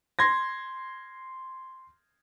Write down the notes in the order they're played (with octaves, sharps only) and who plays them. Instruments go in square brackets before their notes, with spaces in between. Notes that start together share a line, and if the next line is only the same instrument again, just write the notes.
[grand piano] C6 G#6 A#6